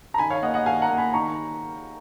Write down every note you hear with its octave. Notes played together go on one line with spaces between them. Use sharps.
A#5
D#3 G#5 B5
C#5 F5
A#3 D#5 F#5
D#5 F#5
D#3 F5 G#5
F#5 A#5
A#3
G#5 B5
D#3 A#5 C#6